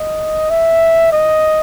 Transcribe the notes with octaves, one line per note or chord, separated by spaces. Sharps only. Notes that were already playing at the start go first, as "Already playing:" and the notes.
Already playing: D#5
E5
D#5